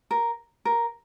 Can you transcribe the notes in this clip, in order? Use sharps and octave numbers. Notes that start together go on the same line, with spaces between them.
A#4
A#4